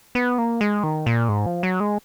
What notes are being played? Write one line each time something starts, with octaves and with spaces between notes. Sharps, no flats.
B3
A#3
G#3
D#3
A#2
G#2
F3
F#3
G#3